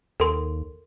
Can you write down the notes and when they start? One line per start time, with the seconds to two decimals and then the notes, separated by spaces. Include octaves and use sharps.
0.20 D#2 A4 A#4 C6